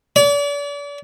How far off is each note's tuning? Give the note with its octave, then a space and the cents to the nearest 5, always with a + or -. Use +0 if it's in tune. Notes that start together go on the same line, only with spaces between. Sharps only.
D5 -40